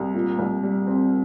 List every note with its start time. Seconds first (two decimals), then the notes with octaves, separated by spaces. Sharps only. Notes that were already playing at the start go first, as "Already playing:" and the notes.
Already playing: C2
0.15 A#2
0.39 C2
0.63 G3
0.87 C4